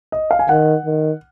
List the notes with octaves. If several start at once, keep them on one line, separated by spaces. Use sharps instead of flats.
D#5
F5
G#5
D#3 F#5
D#3